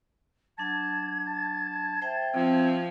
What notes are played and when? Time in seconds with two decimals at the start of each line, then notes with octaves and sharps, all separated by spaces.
0.58 F#3 D4 F#5 A5 G#6
1.27 A5
2.02 C5 E5 G5 A5
2.35 F3 C4